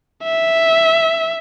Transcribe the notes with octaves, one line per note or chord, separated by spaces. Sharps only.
E5